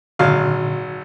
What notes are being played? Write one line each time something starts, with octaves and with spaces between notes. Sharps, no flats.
G#1 A#2 D3 F#3 F5